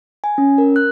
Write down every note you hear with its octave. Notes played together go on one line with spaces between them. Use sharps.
G#5
C#4
A#4
F#6